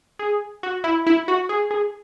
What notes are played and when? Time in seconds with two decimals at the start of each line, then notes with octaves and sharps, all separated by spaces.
0.19 G#4
0.63 F#4
0.84 E4
1.07 E4
1.28 F#4
1.49 G#4
1.71 G#4